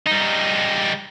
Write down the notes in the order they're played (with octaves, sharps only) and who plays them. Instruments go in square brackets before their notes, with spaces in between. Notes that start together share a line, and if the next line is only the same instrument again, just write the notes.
[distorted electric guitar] G3 D#4